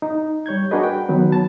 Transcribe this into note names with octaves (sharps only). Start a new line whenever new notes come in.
D#4
G3 C#5 G6 G#6
D4 F#4 G#4 A#4 B4 D#5
G5
D#3 F#3 B3 B4
A5